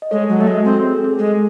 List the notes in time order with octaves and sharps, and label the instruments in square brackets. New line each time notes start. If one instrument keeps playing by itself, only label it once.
[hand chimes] D#5
[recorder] G#3 [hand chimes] A4 C#5
[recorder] F#3
A3
[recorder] G#3 [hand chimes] F#4 A4
[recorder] C4
[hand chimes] G#4
A4
G#4
[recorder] G#3